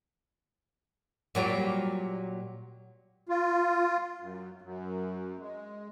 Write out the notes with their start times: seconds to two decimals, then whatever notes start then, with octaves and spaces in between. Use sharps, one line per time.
1.35 A#2 F#3 G3
3.29 F4
4.21 F#2
4.62 F#2
5.39 G#3